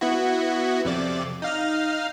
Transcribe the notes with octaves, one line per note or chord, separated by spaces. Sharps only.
B3 E4 F#4
F2 C3 D5
D#4 F5 F6